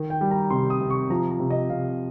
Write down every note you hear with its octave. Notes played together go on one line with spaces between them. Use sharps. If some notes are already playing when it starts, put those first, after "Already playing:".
Already playing: D#3
G5
G3
A#5
C3 C6
D#6
C3
C#6
F3 A#5
A#5
C3
D#5
C3 F5